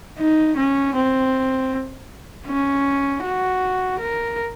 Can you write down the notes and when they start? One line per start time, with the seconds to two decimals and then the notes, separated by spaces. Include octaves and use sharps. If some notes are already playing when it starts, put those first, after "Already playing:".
0.18 D#4
0.57 C#4
0.95 C4
2.47 C#4
3.23 F#4
3.99 A#4